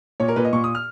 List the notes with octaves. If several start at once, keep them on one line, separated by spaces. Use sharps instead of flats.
A#2 C#5
A#4
A#2 B4
D#5
A#2 C#6
D#6
F6